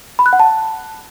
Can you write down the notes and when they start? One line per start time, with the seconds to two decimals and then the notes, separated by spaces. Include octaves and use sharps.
0.19 B5
0.26 F#6
0.33 F#5
0.40 A5